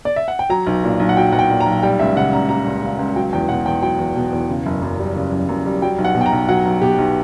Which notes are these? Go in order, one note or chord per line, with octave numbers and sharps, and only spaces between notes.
D5
E5
F#5
G5
F#3 A#5
B1
A#2
B1
F#5
F#3 G5
B1 F#5
G5
A#2
A#5
B1
G3 G5
C#2 E5
C#3 F#5
C#2 A#5
G3 A#5
C#2
C#3
C#2
F#3 G5
E2 G5
B2 F#5
E2 G5
F#3 G5
E2
B2
E2
C#3
F#1
F#2
G3
C#3
F#1
F#2
G3
F#3 G5
B1
F#5
B2
G5
A#5
B1
F#3 F#5
B1
B2 G4
B1